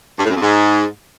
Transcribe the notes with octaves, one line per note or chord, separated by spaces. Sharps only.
G2
A2
F#2
F2
G#2